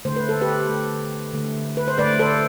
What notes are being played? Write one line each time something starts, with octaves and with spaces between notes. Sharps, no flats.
D3 A3 C5
B4
A4
G4 B4
D3 A3
D3 A3
B4
C5
D3 A3 B4 D5
A4 C5